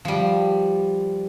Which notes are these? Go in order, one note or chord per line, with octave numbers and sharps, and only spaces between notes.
F3 G3